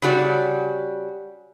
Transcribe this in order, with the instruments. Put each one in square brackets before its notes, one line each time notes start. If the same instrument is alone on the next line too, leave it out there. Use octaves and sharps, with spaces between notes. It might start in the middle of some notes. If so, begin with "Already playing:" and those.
[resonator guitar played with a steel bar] C#3 G3 F#4 D5